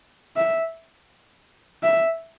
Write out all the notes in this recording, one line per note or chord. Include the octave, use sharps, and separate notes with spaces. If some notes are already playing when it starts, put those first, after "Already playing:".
E5
E5